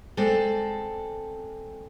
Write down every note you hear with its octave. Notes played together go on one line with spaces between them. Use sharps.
G#3 C4 A4 D5